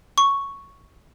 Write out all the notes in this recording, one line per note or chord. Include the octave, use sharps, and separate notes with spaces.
C#6